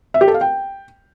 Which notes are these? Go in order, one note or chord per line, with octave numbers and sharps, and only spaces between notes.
E5
G4
A4
F5
G5